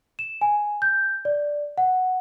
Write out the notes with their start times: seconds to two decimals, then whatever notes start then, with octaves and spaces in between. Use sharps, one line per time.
0.19 E7
0.41 G#5
0.82 G6
1.25 D5
1.78 F#5